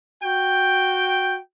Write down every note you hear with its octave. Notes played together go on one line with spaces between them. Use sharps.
F#4 G5